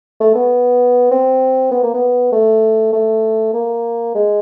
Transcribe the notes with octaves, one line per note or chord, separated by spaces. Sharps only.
A3
B3
C4
B3
A#3
B3
A3
A3
A#3
G#3